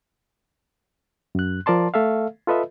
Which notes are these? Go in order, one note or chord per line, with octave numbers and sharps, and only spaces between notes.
F#2 F#6
F3 A#4 D5 A5 C6
A3 A4 E5 F5
F4 A4 B4 D#5 E5